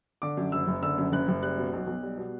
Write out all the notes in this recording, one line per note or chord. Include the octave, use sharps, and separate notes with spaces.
D3 D6
F#2
F#1 E6
F#1
D3 E6
F#2
F#1 F#6
F#1
G3 F#6
B2
B1
B1
G3
B2